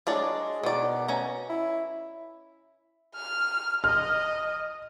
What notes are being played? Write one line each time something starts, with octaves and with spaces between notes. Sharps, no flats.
F#3 G#3 D4 D5
B2 D#3 D5
C#4 A#5
E4
F6
D#5 F6